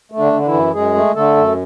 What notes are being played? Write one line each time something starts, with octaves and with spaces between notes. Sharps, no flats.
A3
D3 D4
D3
D4
E3 E4
F#2
F#2 G#3 G#4
A3
D3 A3 A4
F#2